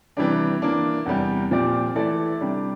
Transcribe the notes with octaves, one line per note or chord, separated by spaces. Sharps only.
C3 E3 G3 D4
E3 A#3 D4
E2 C3 G3
A#2 F3 C4 G4 D5
E3 A3 E4 A4 D5
C3 G3 D4